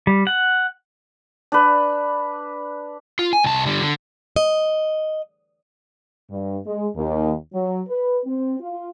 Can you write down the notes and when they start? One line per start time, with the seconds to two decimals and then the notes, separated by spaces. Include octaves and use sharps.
0.07 G3
0.27 F#5
1.52 D4 B4
3.19 F4
3.33 G#5
3.44 C2 A5
3.66 D3 G3
3.82 D3
4.36 D#5
6.30 G2
6.66 G#3
6.95 D#2
7.53 F#3
7.88 B4
8.25 C4
8.60 F4